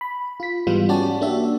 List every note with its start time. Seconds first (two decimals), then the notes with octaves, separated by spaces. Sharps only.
0.01 B5
0.40 F4 B6
0.67 G#2 E3 G3 G#3 B3 F4
0.89 C#4 F#4 G4 D5 A5
1.21 A#3 D4 F#4 G4 E5